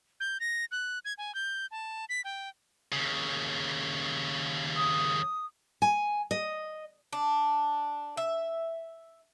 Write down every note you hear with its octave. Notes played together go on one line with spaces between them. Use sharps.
G6
A#6
F#6
G#6
G#5
G6
A5
B6
G5
D#2 C#3
D#6
G#5
D#5
D4
E5